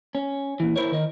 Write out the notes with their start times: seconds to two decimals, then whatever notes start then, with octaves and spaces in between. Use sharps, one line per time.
0.15 C#4
0.60 A#2 E3
0.76 E4 A#4 C5 C#5
0.92 D#3 A#4 D#5